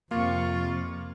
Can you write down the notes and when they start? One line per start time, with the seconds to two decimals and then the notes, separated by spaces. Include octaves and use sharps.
0.11 F2 C3 A#3 F4 C#6 A6